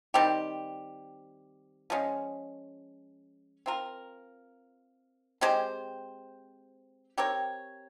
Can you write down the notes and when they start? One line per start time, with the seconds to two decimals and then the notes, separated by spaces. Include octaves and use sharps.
0.14 D#3 G3 C4 G4
1.90 F3 G#3 C#4
3.66 C4 F4 A#4
5.41 G#3 C4 G4 C5
7.18 C4 G4 A#4 C#5